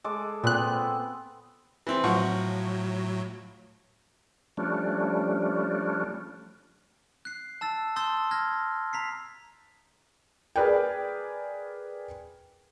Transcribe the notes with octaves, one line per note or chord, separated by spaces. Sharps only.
G#3 A4 D6
A#2 B3 C4 F#6
E3 C4
A2 F3 F#3 F#5 C#6
F3 G3 A3 C#4 D4
F#6 C7
A5 E6 A6
A5 C6 D#6 E6 G6 A6
F6 G#6 A#6
A#5 B6 C7
G#4 A#4 B4 D5 G5